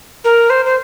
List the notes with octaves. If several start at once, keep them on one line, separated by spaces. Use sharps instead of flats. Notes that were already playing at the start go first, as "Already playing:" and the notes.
A#4
C5
C5